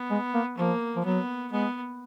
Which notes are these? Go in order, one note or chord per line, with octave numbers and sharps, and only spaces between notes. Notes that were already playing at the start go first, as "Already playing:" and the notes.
Already playing: B3
G#3
A#3
F3 A#3
F3
F#3 B3
G#3 B3